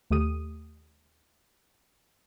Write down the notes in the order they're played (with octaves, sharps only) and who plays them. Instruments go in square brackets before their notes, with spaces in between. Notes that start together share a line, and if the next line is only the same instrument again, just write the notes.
[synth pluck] D#2 A3 G4 D#6 D#7